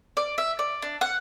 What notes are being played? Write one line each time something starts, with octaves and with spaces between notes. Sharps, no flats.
D5
E5
D5
D4
F#5